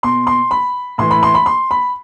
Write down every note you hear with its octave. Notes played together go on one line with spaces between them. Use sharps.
B2 C6
C6
B5
A2 E3 C6
B5
C6
B5
C6
B5